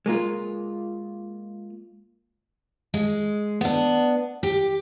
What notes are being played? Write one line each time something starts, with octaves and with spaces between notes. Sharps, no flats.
G#3 A#3 F4
G#3
B3 D4
G4